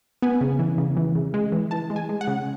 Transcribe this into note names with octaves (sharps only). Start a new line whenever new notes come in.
B3 G#5
C#3
E3
C#3
E3
C#3
G#3
E3
E3 A5
G#3
G#5
G#3
F#5
C#3